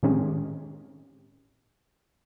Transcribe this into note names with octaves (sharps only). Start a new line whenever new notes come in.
A2 D#3 G#3 C4 C#4 G4